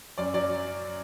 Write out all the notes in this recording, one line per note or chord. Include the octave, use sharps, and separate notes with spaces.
F#2 D5
F#3 D5